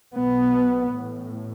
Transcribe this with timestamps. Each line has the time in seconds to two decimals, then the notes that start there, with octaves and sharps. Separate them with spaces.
0.14 B1 B2 B3
0.95 A1 A2